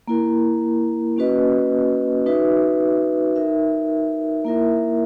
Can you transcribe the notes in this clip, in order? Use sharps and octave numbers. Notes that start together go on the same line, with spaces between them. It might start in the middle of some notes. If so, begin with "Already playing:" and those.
A#3 E4 A#4
A#3 C#4 F#4 B4 D#5
D#4 F#4 B4 E5
D#4 A#4 E5
A#3 E4 A#4 E5